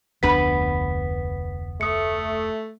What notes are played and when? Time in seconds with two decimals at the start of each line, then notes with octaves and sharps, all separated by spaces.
0.23 F1 D2 B3 D4 B4 B6
1.81 A3 D#6 C#7